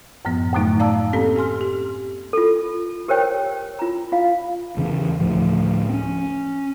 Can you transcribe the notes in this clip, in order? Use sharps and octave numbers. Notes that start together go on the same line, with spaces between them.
F#2 A2 F3 B3
F#2 A2 D3 F#3 A3 D#4
D5 F5 A5 A#5 D6 E6
A#3 C4 C#4 G4 A4
G4 G#5 C6 F6
G4
F4 A4
G4 A#4 C5 C#5 G5
F4 A#5
F4 F5
E2 C#3 E3 C#4
D2 A2 F3
C4 C#4